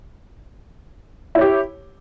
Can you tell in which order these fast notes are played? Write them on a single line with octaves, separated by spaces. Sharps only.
E4 C#5 G4